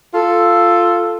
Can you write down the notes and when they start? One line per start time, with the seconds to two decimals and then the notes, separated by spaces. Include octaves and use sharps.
0.14 F4 A4